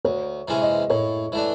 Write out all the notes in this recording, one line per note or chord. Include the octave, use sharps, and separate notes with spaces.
D2 C#5
C3 E3 G#3 C#4
D#5
A2 C#5
E3 A3 D4